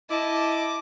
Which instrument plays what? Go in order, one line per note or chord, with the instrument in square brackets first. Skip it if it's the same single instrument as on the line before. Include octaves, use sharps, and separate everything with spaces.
[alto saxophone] E4 [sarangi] D#5 [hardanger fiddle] A5 [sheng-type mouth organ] D6